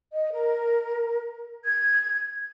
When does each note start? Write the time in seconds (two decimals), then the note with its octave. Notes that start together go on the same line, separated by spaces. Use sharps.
0.13 D#5
0.33 A#4
1.65 G#6